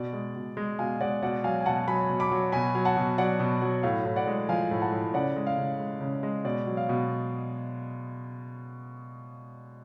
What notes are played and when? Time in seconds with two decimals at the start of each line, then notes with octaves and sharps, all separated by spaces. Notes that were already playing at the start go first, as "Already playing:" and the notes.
Already playing: B2 D5
0.13 G#3
0.36 B2
0.57 G#3
0.79 B2 F5 G#5
1.01 G#3 D5 F#5
1.22 B2 D5 F#5
1.44 F#3 F5 G#5
1.61 G#5
1.66 B2 F#5 A5
1.88 F#3 G#5 B5
2.09 B2
2.20 B5 D6
2.31 F#3
2.52 B2 G#5 B5
2.75 F#3
2.85 F#5 A5
2.97 B2
3.18 F#3 D5 F#5
3.40 B2
3.62 F#3
3.83 A2 F5
4.05 A2
4.16 D5 F#5
4.27 G#3
4.49 F3 F5 G#5
4.71 A2
4.81 F#5 A5
4.92 A2
5.14 C#3 D5 F#5
5.36 G#3
5.47 F5
5.58 C#3
5.80 G#3
6.01 C#3
6.23 G#3
6.44 B2 D5
6.67 F#3
6.77 F5
6.89 B2